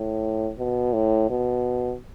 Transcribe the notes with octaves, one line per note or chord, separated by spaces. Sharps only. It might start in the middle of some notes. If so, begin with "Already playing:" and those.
Already playing: A2
B2
A2
B2